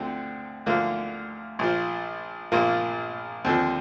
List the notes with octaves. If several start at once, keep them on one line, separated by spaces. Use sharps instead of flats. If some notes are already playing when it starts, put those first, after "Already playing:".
Already playing: D2 D3 F3 C4
D2 D3 F3 A#3
A#1 A#2 F3
A#1 A#2 F3 A#3
D#2 D3 F3 C4